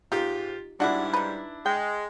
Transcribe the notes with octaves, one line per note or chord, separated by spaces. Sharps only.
G#2 D#4 F4 G4
G#2 G3 D4 E4 F#4 F#5
D#4 B4
G#3 G5